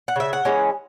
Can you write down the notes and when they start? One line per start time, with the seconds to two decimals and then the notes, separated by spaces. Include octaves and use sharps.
0.08 F#5
0.16 C#3 E5
0.33 F#5
0.45 E3 G#3 C#4